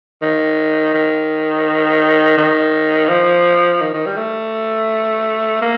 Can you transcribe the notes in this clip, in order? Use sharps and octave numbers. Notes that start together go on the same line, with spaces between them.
D#3
D#3
D#3
F3
D#3
D#3
G3
A3
A#3